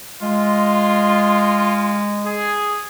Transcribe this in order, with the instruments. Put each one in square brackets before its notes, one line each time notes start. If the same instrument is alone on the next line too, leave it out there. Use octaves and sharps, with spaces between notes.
[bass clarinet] G#3 [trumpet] F4
[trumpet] G#4